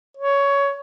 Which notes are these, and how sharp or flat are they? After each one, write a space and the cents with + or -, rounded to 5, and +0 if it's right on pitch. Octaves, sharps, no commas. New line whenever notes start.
C#5 +15